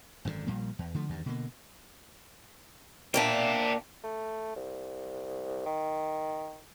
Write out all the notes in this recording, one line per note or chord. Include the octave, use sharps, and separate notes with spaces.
G#1 F#2 A2 D3
A#1 A#2 G3 A#3
E2
D3 F3 A3
E2 G2 D#3
B2 D3 A#3
A#2 A#3 D4 E5 G5
A3
C2
D#3